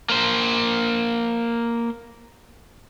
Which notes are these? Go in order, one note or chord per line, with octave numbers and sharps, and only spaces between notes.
A#3 C5